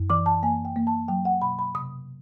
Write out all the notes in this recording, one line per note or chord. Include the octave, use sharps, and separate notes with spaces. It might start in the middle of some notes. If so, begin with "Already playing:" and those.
Already playing: F#2
E3 D6
A5
A#3 G#5
G5
A#3
A5
F#3 G5
F#5
B2 B5
B5
C3 D#6